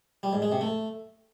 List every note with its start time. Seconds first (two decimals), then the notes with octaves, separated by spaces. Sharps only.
0.23 G3
0.33 G#2
0.42 G#3
0.52 C3
0.61 A3